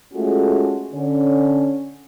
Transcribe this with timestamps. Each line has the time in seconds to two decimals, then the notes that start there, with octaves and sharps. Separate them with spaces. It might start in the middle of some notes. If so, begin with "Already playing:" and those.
0.14 G#3 A3 C#4 F4 F#4 A4
0.93 D3 C#4